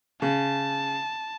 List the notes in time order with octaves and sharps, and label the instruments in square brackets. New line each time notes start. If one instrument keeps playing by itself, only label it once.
[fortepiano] C#3 [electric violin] A5